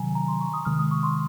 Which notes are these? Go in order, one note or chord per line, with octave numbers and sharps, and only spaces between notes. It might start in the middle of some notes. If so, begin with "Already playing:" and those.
Already playing: C3 D#3 F#3 G#5 A#5
A#5
C6
C#6
D#6
C3 D#3 G#3 F6
D#6
C#6
C6